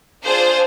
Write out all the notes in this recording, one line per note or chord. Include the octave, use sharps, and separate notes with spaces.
D4 F4 G#4 C5